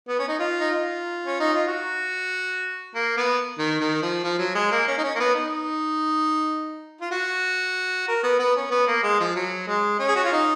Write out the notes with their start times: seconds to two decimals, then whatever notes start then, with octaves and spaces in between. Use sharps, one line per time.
0.08 B3
0.19 C#4
0.28 D#4
0.39 F4
0.60 D#4
0.71 F4
1.26 C#4
1.40 D#4
1.53 F4
1.67 F#4
2.95 A#3
3.17 B3
3.58 D#3
3.80 D#3
4.02 F3
4.24 F3
4.38 F#3
4.55 G#3
4.71 A#3
4.88 C#4
4.98 D#4
5.04 C#4
5.15 A#3
5.20 B3
5.35 D#4
7.01 F4
7.11 F#4
8.08 A#4
8.23 B3
8.40 B3
8.56 C#4
8.71 B3
8.87 A#3
9.03 G#3
9.20 F3
9.35 F#3
9.67 G#3
9.99 C#4
10.08 G#4
10.16 F#4
10.24 F4
10.32 D#4